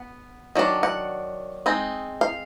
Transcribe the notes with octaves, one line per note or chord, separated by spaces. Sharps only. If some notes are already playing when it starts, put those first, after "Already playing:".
Already playing: B3
D#3 F#3 D4
F#5
G#3 C4 D#4
F5